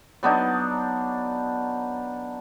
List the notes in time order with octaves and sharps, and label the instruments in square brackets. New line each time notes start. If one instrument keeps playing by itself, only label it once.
[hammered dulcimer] F#3 B3 D4 D#4